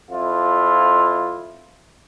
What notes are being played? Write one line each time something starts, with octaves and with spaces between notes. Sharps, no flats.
F2 E4 F4